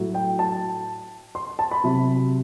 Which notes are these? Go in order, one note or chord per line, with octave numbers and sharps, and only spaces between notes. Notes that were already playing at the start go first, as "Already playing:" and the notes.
Already playing: A2 F#3
G5
A5
C6
A5
B5
C3 F#3